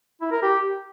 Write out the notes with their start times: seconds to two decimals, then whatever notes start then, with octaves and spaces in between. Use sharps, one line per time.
0.21 E4
0.32 A#4
0.43 G4